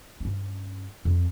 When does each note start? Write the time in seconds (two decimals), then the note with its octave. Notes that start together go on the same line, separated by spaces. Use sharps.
0.20 G2 C#4
1.05 F2